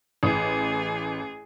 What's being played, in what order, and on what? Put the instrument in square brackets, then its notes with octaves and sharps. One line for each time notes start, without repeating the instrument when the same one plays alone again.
[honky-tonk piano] A1 [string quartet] G#4